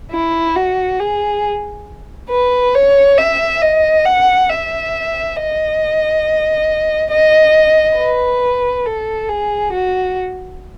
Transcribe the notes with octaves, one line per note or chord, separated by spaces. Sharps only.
E4
F#4
G#4
B4
C#5
E5
D#5
F#5
E5
D#5
D#5
B4
A4
G#4
F#4